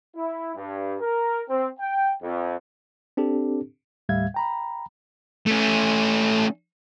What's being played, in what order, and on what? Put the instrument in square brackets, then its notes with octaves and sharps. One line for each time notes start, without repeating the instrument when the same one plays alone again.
[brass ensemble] E4
G2
A#4
C4
G5
F2
[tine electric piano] C4 D4 G4 A4
[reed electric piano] D#2 A2 G3 E5 F5 G#6
G5 A#5 B5
[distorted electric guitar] A3 C#4